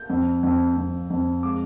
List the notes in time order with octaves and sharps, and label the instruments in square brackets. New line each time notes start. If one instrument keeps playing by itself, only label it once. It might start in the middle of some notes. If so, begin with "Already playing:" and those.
Already playing: [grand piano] G6
F2
F2
F2
F2
G#3 D6